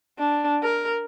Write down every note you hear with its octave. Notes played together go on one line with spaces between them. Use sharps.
D4
A#4